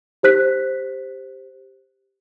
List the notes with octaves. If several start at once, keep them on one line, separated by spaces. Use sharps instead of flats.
G4 C5 F#6 B6